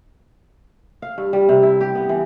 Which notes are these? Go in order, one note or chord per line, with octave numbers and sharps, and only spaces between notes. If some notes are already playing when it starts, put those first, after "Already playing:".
F5
G2
G3
C3
E4
G4
B3
E3